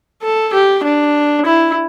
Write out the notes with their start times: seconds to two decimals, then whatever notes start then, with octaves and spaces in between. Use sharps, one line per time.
0.22 A4
0.53 G4
0.84 D4
1.45 E4